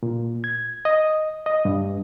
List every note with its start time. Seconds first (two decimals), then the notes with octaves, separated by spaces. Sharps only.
0.03 A#2
0.44 G#6
0.85 D#5
1.46 D#5
1.65 G2